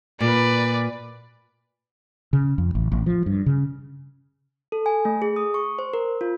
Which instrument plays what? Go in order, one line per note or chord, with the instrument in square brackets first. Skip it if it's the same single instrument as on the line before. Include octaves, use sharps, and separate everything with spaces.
[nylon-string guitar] A#2 [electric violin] B4 D5
[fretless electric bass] C#3
F2
A1
A1
F3
G2
C#3
[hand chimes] A4
G#5
A3
G#4
D#6
C#6
C5
A#4
F4